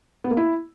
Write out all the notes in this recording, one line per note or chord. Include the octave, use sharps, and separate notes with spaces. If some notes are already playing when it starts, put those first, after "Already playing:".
B3
A#3
E4